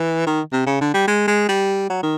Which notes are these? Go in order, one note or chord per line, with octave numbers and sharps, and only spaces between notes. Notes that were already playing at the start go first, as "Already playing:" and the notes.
Already playing: E3
D#3
C3
C#3
D3
G3
G#3
G#3
G3
F#3
D#3